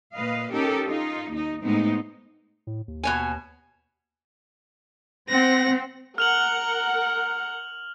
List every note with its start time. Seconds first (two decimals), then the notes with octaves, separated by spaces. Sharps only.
0.14 A#2 B4 D#5 F5
0.52 C#4 D#4 G4 A4 A#4
0.87 D#4 F4
1.31 D#2 D#4
1.64 A2 G#3 A3 B3 C4 D#4
2.67 A2
2.88 D#2
3.03 B2 C#5 G#5
5.29 C4 F#5 A#6
6.18 A#4 F#5 F6 F7 F#7